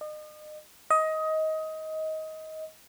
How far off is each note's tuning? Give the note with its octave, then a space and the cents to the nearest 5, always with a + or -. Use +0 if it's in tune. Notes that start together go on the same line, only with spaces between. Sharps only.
D#5 -35
D#5 +20